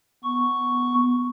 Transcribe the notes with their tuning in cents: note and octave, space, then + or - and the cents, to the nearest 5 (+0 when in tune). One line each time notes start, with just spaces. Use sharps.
B3 +0 C#6 +0